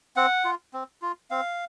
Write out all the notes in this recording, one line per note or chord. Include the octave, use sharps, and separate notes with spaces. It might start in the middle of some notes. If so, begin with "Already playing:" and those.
C4 F#5
F4
C4
F4
C4 F5